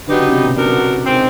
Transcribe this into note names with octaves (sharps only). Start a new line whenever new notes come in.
D3 F#3 B3 D#4 G4 B4
C#3
C3
B2
B2 F#3 B3 D4 F#4 A#4
D#3 G#3 C4